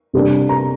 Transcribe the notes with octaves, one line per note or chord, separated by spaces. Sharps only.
C3 G3 A#3 D4
A#5